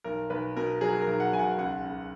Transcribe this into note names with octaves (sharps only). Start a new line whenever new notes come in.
B1 A#4
B1 B4
B2 A#4
F#3 G#4
A#4
B1
F#5
B1 G#5
F#5
C#2 F#5
C#2